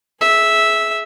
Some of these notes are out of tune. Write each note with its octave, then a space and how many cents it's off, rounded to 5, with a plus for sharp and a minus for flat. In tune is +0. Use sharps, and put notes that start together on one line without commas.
G#4 +25 E5 -5